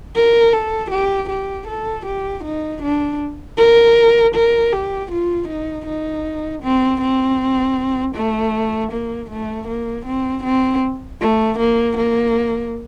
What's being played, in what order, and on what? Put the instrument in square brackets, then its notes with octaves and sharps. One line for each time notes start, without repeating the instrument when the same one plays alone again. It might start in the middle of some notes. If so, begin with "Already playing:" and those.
[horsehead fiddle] A#4
A4
G4
G4
A4
G4
D#4
D4
A#4
A#4
G4
F4
D#4
D#4
C4
C4
A3
A#3
A3
A#3
C4
C4
A3
A#3
A#3